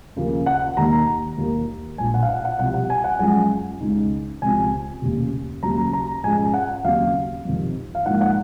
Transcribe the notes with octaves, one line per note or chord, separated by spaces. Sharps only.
D#2 C#3 F3 A#3
F#5
D#2 D#3 A#3 A#5
D#2 D#3 A#3
A#1 A#2 F3 G#5
F#5
F5
F#5
F#5
C2 C3 F3 F#5
F#5
G#5
F#5
F#2 F3 G#3 C#4 F4 G#5
C#2 C#3 G#3 D#4
C#2 C3 F3 C4 G#5
F1 D#2 C#3
D#2 C#3 F#3 A#5
A#5
G#2 F3 G#3 C#4 G#5
F#5
D#2 C#3 F#3 C4 F5
F2 C3 D#3
F5
G#2 F3 A#3 D#4 F#5
F#5